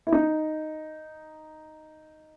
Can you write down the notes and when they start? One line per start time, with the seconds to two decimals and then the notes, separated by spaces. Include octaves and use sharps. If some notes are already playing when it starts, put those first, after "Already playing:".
0.07 E4
0.13 D#4